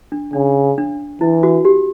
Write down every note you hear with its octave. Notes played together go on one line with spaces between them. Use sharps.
D4
C#3 D4
D4
E3 E4
F#4
G4